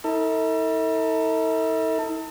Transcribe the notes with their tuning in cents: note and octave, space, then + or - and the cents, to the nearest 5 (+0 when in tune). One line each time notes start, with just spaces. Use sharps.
E4 -45 A4 +35